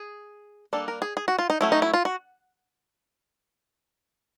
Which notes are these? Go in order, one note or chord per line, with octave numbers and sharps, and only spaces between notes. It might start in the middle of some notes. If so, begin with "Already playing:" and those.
Already playing: G#4
G3 A#3 D4 A4
A#4
G#4
G#4
F#4
F4
D#4
F#3 A3 C#4 E4
D#4
E4
F4
F#4